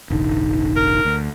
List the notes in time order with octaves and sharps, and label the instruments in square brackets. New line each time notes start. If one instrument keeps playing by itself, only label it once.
[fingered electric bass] E1 A1 D3 [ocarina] D#4
[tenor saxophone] A#4
[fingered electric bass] D2